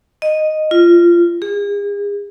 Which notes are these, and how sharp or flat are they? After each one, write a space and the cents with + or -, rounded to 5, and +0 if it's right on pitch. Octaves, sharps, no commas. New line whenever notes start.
D#5 -5
F4 -20
G#4 -40